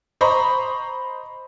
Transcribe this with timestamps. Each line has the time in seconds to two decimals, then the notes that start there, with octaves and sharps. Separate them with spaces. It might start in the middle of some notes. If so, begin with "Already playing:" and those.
0.21 C5 D#5 A#5 B5 C#6